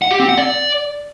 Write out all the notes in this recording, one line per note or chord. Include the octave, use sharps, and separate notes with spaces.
F#5
G4
C4
F#5
D5